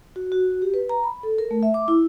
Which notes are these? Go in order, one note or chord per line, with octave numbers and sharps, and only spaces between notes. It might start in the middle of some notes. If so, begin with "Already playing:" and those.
F#4
F#4
G4
B4
A#5
B5
A4
A#4
A3
E5
D6
E4